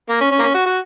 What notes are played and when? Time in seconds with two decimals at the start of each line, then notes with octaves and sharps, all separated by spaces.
0.09 A#3
0.21 C#4
0.31 C#4
0.39 A#3
0.43 C#4
0.54 F#4
0.66 F#4